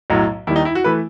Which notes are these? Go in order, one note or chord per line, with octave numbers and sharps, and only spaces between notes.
B1 A2 F#3
D#2 D#3 G3 E4
D#4
E4
F#4
E3 A3 B4